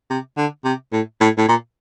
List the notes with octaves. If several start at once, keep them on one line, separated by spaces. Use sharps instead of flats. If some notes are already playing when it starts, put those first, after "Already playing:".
C3
D3
C3
A2
A2
A2
A#2